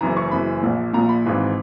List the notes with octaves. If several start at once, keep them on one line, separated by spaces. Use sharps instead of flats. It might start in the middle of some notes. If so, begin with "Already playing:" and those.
F#1 F#2 E3 A#5
C#6
F#1 F#2 E3 B5
A#1 A#2
A#1 A#2 A#5
B5
G#1 G#2 E3